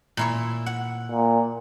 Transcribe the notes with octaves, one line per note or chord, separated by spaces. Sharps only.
A#2 E4 C#5
F#5
A#2